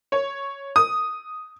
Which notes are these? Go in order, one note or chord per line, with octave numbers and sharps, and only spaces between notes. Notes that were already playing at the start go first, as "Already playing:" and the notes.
C#5
D#6